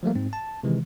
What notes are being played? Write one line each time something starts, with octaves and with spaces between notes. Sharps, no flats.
F3 G3 A3 A#3
G#2 C4
A5
C3 D#3 E3 G#3